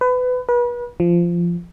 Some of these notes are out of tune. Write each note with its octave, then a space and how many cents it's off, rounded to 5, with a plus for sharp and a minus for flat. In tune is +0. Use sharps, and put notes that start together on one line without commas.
B4 +25
B4 -35
F3 -15